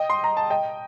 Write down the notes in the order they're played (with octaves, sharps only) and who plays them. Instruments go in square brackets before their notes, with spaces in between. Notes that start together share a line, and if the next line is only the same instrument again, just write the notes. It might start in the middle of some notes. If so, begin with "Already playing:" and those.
Already playing: [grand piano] D#5 G5
C6
A#5
A5
D#5 G5